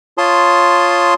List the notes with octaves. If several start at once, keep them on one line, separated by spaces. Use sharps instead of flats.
F4 C#5 A5 C6 D#6